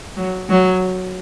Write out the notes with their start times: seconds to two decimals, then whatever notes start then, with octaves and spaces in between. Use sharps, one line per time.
0.17 F#3
0.49 F#3